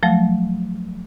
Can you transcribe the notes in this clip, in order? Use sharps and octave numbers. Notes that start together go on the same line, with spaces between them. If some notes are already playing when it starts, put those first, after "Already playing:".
F3 F#3 A3